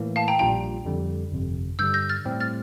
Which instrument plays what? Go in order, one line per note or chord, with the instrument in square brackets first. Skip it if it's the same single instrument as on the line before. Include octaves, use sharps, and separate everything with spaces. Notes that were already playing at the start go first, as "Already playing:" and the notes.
Already playing: [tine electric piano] A2 E3 A#3
[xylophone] F5 A5
G5 A#5
[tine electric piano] A#1 A#2 G3 D4 F4 [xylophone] G5 A#5
[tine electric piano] F2 D3 G3
G1 F2 C3
[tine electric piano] G2 D3 G3 [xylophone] E6 G6
[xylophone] G6 A#6
F6 A6
[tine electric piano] A2 G3 C4 G4
[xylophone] F6 A6